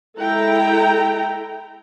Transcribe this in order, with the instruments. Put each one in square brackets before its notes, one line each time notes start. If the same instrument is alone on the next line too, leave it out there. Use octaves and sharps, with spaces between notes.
[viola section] G#3 E4 A4 G5 A#5